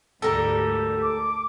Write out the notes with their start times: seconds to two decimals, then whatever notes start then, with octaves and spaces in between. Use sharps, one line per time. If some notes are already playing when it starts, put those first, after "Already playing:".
0.22 D2 G#2 G3 A4 A#4
1.02 D6